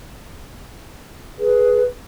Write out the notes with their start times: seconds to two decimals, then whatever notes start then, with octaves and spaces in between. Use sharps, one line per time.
1.39 G#4 B4